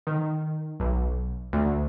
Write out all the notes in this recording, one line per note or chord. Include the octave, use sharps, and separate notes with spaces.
D#3
B1
D2